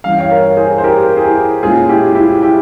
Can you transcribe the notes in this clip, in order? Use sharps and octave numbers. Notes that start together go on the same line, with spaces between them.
G2 E3 G3 C#4 F5
G5
C#5 F5
A#4 C#5
G#4 C5
C5
G4 A#4
G#4
E4 G4
A#2 G#3 C#4 F4 G#4
E4 G4
E4 G4
E4 G4